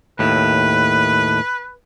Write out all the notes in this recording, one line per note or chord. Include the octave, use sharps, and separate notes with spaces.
D#2 A2 B4